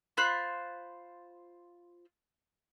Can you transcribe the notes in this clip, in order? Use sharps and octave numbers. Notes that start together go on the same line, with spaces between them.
F4 C5 B5 F#6